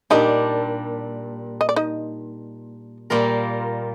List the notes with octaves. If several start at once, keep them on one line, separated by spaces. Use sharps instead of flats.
A#2 G3 D4 D#4 G4 D#5
D#5
D5
D#4 D#5
A#2 G3 A#3 F4 A#4